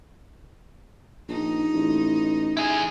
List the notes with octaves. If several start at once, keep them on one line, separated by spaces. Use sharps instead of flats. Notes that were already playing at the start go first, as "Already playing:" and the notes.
A#1 D#4
A1
E4 G#4